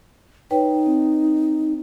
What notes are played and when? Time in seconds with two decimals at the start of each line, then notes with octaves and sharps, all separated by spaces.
0.51 D#4 B4 C#5 G5
0.86 C4